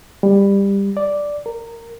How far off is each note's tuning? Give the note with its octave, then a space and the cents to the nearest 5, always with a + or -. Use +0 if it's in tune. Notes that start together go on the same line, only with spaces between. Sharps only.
G3 +20
D5 +0
A#4 -15